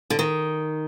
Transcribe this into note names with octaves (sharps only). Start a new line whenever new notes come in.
D3
D#3